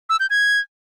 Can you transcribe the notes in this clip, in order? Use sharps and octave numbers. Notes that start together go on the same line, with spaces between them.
E6
G6
G#6